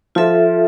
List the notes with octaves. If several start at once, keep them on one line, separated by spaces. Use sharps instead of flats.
F3 F4 A4 E5